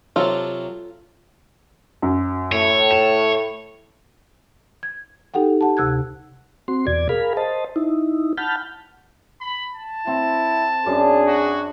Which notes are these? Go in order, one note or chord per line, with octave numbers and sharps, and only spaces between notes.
C3 F#3 F4 A4
F#2
A2 C#5
E7
G#6
D#4 G4 A4 F#5 G5
G4 F#5 A5
D2 C3 E6 F#6 G#6
C4 F#4 C6
E2 B2 D5 G#6
G#4 A#4 F5 B5
C5 D#5 A5
D#4 E4
F#5 A5 B5 F6 G6
B5
A5
C4 E4
F#2 D4 G#4
F#4